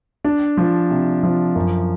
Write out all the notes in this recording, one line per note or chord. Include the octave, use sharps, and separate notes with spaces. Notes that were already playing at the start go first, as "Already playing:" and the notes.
D4
F3
C3
F3
F#2